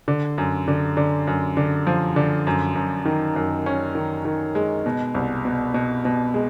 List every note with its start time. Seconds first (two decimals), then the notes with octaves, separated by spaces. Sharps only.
0.08 D3
0.38 F#2
0.68 D3
0.97 D3
1.27 F#2
1.57 D3
1.87 F3
2.16 D3
2.47 F#2
2.76 F#2
3.05 D#3
3.36 F#2
3.66 C#4
3.95 D#3
4.25 D#3
4.55 G#3
4.86 B2
5.14 C2
5.45 B2
5.74 B2
6.05 B2
6.34 G#3